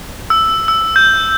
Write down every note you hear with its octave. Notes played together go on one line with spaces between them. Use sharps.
E6
E6
G6